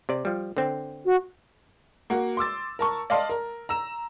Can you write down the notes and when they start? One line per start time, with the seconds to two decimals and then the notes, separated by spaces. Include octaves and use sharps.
0.09 C3 D5
0.25 F3 G3
0.57 D3 C4
1.05 F#4
2.10 A#3 F#4
2.37 C6 D6 E6 A6
2.79 A#4 A5 C#6
3.10 D5 D#5 F5 A5 C6
3.29 A#4
3.69 A#5 E6 E7